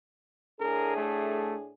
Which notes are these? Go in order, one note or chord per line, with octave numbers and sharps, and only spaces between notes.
A2 D4 G#4 A#4
A3